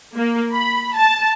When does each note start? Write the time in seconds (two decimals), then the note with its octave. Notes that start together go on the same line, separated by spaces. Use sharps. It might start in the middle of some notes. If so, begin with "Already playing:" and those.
0.17 A#3
0.53 B5
0.96 A5